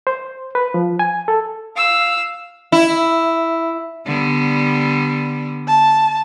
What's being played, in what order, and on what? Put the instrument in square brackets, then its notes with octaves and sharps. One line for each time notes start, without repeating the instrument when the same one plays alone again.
[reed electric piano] C5
B4
F3
G#5
A4
[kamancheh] F5 E6
[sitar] E4
[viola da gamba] D3 G3 B3
[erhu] A5